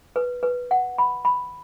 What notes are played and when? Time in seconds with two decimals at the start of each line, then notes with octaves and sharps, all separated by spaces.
0.16 B4
0.43 B4
0.71 F#5
0.98 B5
1.25 B5